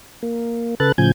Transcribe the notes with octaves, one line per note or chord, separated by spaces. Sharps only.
A#3
C#3 A4 B4 F#6 A6
A2 C#3 F3 G#5 G6 G#6